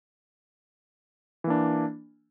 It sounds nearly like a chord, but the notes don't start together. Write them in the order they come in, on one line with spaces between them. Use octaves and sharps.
E3 A#3 D4